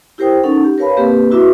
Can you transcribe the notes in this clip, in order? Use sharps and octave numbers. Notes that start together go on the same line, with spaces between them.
E4 G4 A#4 C5 G5 D#6
C#4 D#4 A4 F#5
G4
A#4 B4 C#5 F5 A5 B5
A#3 C4 G4 B4
E4 F#4 B4 E5 D6 E6